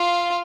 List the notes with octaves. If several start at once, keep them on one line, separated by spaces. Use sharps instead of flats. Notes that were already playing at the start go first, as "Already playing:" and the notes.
Already playing: F4 F5